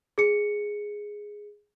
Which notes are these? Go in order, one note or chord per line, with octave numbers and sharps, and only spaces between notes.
G#4 C#7